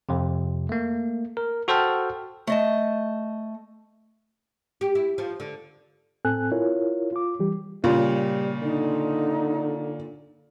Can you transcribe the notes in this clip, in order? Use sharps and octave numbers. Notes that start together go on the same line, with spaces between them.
F2 C3
A3 A#3
A#4
F#4 A4 C5 G5 A5 F6
A3 D#5 A5
G4
E4
F3
D3
A2 C4 A4 G#5 F#6
E4 F4 A#4 C#5
F4 D6
E3 G3 G4
A#2 C#3 G3 F4
D3 D#4